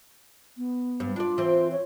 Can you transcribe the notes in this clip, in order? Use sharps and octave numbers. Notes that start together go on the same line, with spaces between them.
B3
G2
D4 F4 D5
E3 C4
C#5